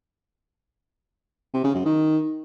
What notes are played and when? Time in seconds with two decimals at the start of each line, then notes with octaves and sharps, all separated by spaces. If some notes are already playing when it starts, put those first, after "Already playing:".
1.53 C3
1.64 C#3
1.75 F#2
1.85 D#3